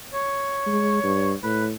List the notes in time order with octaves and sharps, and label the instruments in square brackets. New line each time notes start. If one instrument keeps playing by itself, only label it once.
[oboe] C#5
[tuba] G#3
G2
[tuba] A2 [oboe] B4